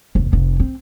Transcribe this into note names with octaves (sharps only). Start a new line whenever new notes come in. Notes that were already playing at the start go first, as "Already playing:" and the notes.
F1 D#2
F1
C4